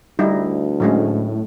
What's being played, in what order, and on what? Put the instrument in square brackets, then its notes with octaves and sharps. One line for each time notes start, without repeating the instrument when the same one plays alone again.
[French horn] D2 [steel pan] G3 D#4 E4
[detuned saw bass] A2 [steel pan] F#3 G#3 C#4